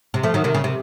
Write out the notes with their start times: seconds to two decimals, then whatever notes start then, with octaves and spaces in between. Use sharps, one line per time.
0.14 C3
0.23 F3 A3
0.34 D#3 F#3
0.44 C3 D#3
0.54 C#3
0.64 C3